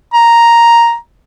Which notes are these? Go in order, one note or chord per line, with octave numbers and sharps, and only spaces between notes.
A#5